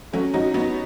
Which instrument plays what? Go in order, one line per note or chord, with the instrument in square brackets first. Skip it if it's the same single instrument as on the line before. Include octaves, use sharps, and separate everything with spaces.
[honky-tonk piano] F#3 A3 C#4
F#3 D#4 F#4
F#3 B3 D#4